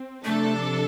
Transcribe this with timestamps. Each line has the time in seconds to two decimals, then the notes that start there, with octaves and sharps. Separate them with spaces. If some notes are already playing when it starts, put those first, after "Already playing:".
Already playing: C4
0.24 C3 F3 A3 D4 A4